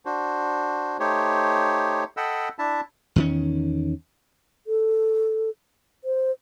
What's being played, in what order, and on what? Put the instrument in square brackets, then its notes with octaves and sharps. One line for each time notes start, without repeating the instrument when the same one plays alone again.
[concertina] D4 F#4 C5
A3 D#4 G4 C5 C#5
A4 D#5 F#5 G5 B5 E6
D4 E4 E5 A5
[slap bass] E2 D#3 C#4
[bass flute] A4
C5